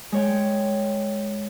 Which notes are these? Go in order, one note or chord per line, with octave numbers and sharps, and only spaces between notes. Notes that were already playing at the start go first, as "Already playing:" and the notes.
G#3 C#5 G5